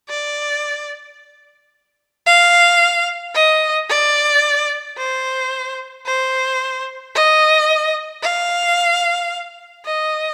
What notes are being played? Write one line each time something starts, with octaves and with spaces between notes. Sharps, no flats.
D5
F5
D#5
D5
C5
C5
D#5
F5
D#5